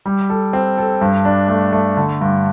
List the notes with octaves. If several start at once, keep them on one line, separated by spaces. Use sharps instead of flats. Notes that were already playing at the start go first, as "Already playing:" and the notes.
G3
A4
C4
A4
G2
D4
A3
A3
D3
G2